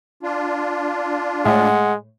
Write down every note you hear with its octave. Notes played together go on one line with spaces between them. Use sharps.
D4 F4
A2 G#3 F#5